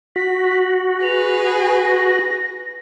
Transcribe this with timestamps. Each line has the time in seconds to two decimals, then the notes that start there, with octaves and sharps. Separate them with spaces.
0.16 F#4 B6
1.03 G#4 B4 F7
1.58 A#6